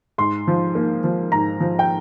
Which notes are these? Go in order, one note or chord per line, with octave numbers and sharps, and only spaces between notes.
G#2 C6
F3
A#3
F3
G#2 A#5
F3
G5